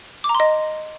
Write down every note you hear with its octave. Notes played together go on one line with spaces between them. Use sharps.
D6
A#5
C6
D#5